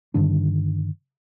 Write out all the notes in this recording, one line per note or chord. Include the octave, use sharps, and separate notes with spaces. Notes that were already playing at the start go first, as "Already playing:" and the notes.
G2 D3 D#3 D4